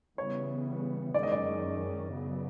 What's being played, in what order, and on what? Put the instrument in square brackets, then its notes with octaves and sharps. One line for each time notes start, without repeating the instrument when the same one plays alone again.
[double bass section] C#3 E3 G3 B3 [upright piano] C#5
[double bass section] F#2 D#3 G#3 C#4 [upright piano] D5
[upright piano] D#5
D5
[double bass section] C#3 F#3 B3